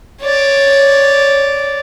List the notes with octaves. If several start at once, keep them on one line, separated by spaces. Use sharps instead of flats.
C#5 D5